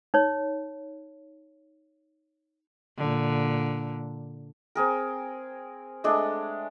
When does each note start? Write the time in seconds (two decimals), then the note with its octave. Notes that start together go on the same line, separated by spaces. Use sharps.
0.14 D#4 C#5
2.98 A#2 D3
4.75 C4 G#4 A#4
6.04 G#3 A3 D4